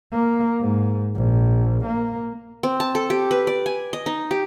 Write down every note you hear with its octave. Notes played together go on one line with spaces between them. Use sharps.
A#3
G#2
A#1
A#3
C4
A5
A4
G4
B4
D5
G#5
D#5
D#4
G4